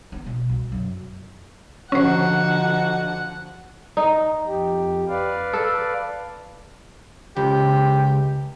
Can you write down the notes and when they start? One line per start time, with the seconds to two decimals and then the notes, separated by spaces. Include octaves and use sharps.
0.12 B3
0.26 B2
0.49 C2
0.72 F#2
1.92 D3 F3 C#4 D#4 F#4 C5 F#5
3.97 D#4
4.47 F2 G4
5.08 B4 D5 F5
5.53 A4
7.36 C#2 G4